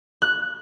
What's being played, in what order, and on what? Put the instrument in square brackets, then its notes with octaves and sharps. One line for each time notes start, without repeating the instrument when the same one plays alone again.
[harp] F#6